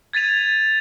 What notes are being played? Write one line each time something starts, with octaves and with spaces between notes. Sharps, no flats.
G#6 A6 B6 D#7 F7